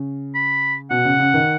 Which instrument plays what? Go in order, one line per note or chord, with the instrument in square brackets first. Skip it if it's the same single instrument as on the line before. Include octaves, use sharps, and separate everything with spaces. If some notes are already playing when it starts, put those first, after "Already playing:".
Already playing: [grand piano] C#3
[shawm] B5
[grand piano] B2 [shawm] F#5
[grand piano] C#3
C#3
D#3